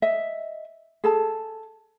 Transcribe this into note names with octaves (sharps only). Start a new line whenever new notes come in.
D#5 E5
G#4 A4 A5